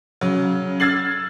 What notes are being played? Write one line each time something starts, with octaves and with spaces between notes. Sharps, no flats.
C#3 F#3
E6 F6 G#6 A6 C7 F#7